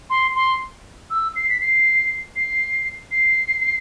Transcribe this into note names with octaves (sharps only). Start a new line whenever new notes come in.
C6
C6
E6
C7
B6
C7
C7
C7